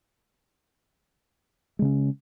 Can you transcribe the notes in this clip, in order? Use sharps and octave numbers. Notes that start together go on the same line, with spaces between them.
C#3 G#3 C#4